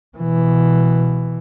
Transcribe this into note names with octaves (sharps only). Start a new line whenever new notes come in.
B2 E3